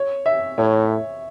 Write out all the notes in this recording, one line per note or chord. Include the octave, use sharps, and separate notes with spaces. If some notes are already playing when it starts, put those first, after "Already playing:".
Already playing: C#5
E5
A2 C#5